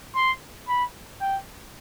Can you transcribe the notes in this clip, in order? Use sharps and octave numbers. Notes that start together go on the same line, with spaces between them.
C6
B5
G5